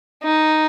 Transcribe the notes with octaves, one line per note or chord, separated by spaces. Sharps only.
D#4